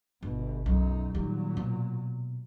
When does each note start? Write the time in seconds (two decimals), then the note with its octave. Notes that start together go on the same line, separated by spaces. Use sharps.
0.23 G1 B2
0.66 B1 F#2 D#4
1.15 A#2 D#3 F#3 G3
1.57 B2